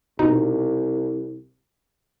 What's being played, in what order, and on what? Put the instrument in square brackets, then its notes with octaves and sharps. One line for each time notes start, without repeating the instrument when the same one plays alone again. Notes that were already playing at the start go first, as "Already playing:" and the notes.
[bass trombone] C2 [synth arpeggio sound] B2 D#4